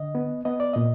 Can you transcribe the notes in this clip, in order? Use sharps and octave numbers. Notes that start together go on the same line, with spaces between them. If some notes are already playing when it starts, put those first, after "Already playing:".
Already playing: D3 D#5
B3
B3 D#5
D5
A#2 D#5